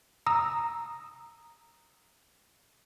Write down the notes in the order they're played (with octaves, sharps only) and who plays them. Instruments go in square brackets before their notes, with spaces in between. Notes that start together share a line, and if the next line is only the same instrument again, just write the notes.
[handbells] A#5 D#6 E6